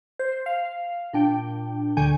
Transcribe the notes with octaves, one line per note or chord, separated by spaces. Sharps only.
C5
F5
A#2 D4 G5
D2 D3 G#5 G6